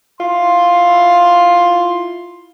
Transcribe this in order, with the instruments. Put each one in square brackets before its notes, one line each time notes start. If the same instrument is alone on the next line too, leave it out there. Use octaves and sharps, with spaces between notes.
[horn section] E4 F4 C6